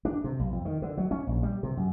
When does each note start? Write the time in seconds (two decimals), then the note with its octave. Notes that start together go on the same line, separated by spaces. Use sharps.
0.05 D4
0.24 C3
0.39 B1
0.52 F2
0.65 D#3
0.82 D3
0.97 F#3
1.11 C#4
1.27 A#1
1.43 G3
1.63 C3
1.77 F#2